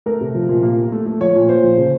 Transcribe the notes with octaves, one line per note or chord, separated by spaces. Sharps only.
A3 A#4
C3
F3
A#2
A#3
A#3
A3
A3
F3 C#5
A#2
A#2 C5
F3
C#3